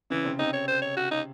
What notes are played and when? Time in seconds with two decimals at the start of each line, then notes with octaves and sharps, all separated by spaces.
0.10 C#3 E3 C#4
0.25 C3 C4
0.39 C3 C4 D#4
0.53 C#5
0.68 C5
0.82 C#5
0.97 F#4
1.11 D#4